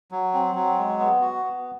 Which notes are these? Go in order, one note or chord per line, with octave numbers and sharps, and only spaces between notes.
F#3
C4
F#3
G#3
B3
F#4
B3